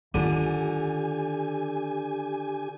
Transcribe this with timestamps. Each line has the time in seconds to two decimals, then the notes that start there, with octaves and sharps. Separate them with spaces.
0.14 D3 D#3 F4 G4 G#5